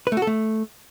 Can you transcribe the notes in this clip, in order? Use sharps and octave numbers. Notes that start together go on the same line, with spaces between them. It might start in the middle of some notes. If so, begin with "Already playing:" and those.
B4
A3
F#4
A4
A3